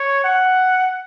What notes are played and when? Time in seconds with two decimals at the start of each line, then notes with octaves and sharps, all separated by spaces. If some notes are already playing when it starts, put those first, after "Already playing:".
Already playing: C#5
0.24 F#5